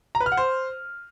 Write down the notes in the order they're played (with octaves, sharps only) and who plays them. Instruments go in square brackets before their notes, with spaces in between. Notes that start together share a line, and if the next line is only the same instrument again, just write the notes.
[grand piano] A#5
B4
F6
F#5
C5